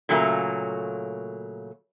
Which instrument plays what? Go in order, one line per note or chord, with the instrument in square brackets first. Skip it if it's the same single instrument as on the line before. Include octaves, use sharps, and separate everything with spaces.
[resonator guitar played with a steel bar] A#2 C#3 F#3 A3 A#3